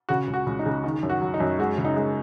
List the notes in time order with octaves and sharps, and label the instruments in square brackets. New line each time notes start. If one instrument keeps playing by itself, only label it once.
[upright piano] C#3 F#4
C#2
F#4
C#2
D#4
C#3
D#3
F#2
F#4
F#3
D#4
F#2
G#3 F#4
C#3
D#4
G#3